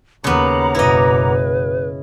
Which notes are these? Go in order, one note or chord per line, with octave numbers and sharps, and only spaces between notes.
D#2 C#3 B3 F#5 A#5 B5 D6
F#1 B2 E4 B4 D#5